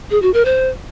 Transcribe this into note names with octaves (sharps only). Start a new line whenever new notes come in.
G#4
F#4
A#4
C5